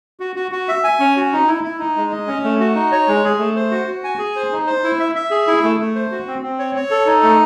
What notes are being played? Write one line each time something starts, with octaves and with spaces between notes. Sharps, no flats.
F#4
F#4
F#4
E5
G#5
C#4
F#4
D#4
E4
E4
D#4
G#3
D#5
C#4
A3
F#4
D#4
C#5
G#3
G#4
A3
C5
F#4
F#4
G#5
G#4
C5
D#4
C5
E4
E5
E5
G#4
E4
A3
A3
C5
F#4
C4
C4
C#5
C#5
A4
D#4
A3